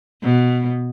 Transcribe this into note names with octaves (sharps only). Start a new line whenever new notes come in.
B2